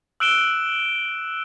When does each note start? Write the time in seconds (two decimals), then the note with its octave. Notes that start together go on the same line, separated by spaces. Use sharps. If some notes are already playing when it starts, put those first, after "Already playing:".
0.20 E6 F#6 D7 E7 G7